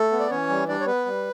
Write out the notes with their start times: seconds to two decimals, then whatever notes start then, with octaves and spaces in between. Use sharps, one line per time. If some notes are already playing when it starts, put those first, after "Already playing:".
Already playing: A3 A4
0.12 B3
0.20 D5
0.31 E3 C#4 C#5
0.49 G3
0.68 G3 D4 D5
0.80 C#5
0.86 B3 B4
1.06 G3